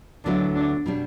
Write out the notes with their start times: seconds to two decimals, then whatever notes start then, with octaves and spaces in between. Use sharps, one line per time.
0.24 D2 D3 F#3 B3 D4 E4
0.55 D4
0.86 B2 G3 D4